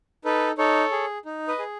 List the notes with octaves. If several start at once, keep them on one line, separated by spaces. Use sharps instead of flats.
D#4 A4 B4
D#4 A4 C#5
G#4
D#4
B4 D#5
G#4